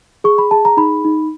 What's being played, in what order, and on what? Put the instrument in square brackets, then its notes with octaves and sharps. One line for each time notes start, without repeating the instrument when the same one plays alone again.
[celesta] G#4 C#6
B5
G#4 A5
A#5
D#4 B5
D#4